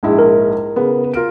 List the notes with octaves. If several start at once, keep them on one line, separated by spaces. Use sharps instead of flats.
A#1 G#2 E4
A#4
C#3 B3
F4 A#4 D7